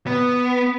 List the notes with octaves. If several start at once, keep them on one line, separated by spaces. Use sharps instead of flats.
B3